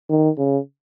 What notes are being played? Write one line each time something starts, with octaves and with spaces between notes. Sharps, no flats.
D#3
C#3